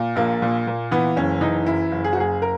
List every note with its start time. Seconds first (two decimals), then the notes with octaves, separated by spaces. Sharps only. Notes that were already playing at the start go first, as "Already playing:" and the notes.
Already playing: A#2
0.16 A#1 A#3
0.42 A#2
0.67 A#2
0.91 E3 B3
1.16 F#1 C#4
1.41 E3 D#4
1.66 F#2 E4
1.92 F#1
2.04 G#4
2.13 F#4
2.17 F#1 G#4
2.42 A#4